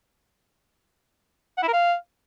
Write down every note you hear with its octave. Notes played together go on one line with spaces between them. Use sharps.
F#5
E4
A#4
F5